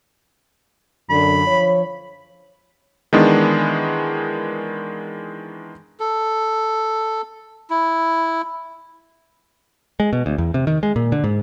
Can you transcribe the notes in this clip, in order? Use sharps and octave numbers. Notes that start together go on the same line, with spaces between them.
F#2 D3 B5
F3 C#5
D#3 E3 G#3 B3 D4
A4
E4
G#3
B2
D2
E2
C3
D#3
G#3
A#2
D3
G#2